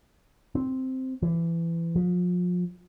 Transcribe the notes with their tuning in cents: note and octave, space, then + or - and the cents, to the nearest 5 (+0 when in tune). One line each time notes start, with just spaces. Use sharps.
C4 -5
E3 +25
F3 +35